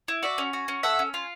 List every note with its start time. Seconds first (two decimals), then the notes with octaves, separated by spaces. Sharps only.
0.08 E4
0.23 F#4 D5 E5
0.38 C#4
0.53 F#4
0.68 C#4
0.83 A4 E5 F#5
0.99 C#4
1.14 F4